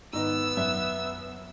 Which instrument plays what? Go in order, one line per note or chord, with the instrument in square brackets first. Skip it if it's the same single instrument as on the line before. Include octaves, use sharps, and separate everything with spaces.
[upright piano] G#2 D#3 D#5 [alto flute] B3 [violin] E6
[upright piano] F#2 [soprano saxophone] E5